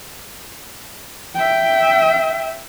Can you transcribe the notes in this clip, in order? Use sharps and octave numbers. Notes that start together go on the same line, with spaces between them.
E5 G5